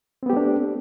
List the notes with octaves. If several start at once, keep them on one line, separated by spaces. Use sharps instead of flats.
A3 B3 C4 D4 G4